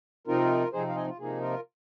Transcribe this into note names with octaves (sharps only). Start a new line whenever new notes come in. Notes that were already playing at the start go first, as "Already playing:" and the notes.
C3 F3 C4 D#4 F4 A#4
C3 F3 C4 D#4 G#4 C5
F5
D#5 G#5
F4
C3 F3 A#3 D#4 G#4
F4 A#4